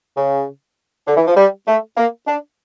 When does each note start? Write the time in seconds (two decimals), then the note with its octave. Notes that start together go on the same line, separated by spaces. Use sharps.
0.17 C#3
1.08 D3
1.17 E3
1.27 F3
1.37 G3
1.67 A3
1.97 A#3
2.27 D4